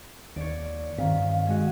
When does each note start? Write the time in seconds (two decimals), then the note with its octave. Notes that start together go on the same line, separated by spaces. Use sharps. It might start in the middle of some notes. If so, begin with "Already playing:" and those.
0.36 D#2 C#5 D5
0.98 G2 D#3 C4 F5 B6
1.47 G#3 C#4 F#4